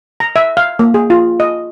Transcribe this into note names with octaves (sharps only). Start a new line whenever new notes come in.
A#5
E5
F5
A#3
G#4
F4
D#5